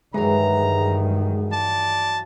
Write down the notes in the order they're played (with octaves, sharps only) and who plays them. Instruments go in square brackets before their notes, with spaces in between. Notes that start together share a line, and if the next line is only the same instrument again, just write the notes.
[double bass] G2 D#3 [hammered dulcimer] E3 F#3 [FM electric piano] G#3 G#4 [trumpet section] A#5
[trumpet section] D5 A5